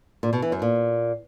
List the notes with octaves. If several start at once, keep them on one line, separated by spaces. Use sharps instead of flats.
A#2
B2
E3
F#2
A#2